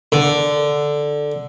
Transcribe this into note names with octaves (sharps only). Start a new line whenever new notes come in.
D3